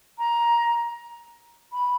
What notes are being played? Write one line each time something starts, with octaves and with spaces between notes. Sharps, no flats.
A#5
B5